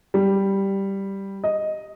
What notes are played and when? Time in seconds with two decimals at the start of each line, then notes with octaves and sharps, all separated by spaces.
0.14 G3
1.44 D#5